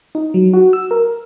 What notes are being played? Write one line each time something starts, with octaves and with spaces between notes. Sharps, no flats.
D#4
F#3
F#4
E6
A#4